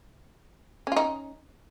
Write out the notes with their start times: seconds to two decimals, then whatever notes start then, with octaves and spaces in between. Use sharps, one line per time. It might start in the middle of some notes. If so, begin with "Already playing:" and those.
0.87 C#4
0.92 F4
0.96 D#4